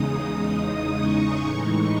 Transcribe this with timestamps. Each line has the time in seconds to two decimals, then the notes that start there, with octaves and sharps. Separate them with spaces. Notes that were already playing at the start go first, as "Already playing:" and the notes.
Already playing: E2 C#3 G#3 D#4 D#6
0.95 C#6
1.40 A2 E3 G#3 D#4 C#6